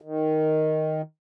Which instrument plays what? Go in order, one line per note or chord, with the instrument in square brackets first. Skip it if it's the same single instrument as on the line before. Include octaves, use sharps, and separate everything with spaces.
[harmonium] D#3